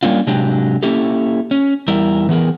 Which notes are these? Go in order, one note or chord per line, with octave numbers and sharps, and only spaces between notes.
G3 A#3 C#4 D4 F4
C3 F#3 G#3 D4 G4
A#3 C#4 E4 G4 A4
C#4
E2 G3 E4 A#4
E3 B3 G#4 A#4